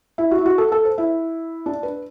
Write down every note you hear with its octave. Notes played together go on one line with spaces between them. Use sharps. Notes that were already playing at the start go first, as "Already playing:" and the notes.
E4
F#4
E4
F#4
A4
A4
C5
E4
D4
B4